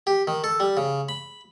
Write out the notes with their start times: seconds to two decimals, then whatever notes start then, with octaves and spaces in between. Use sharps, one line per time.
0.07 G4
0.27 D#3
0.44 A4
0.60 G3
0.77 C#3
1.09 B5